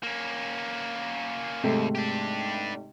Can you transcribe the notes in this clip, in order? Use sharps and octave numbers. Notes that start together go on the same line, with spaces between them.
A#3 C#4
D#2 G#2 C3 A3
D4 G4